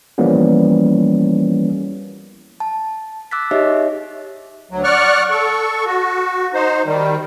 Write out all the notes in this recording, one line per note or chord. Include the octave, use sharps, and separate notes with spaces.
E3 F3 G3 A#3 B3 C#4
A5
D6 E6 F#6 A6 B6
D#4 G4 G#4 C#5 D#5 E5
D2 F#3
D5 F#5 C#6 F6 F#6
A4 C#6
F#4
D#4 C5
D#3 G3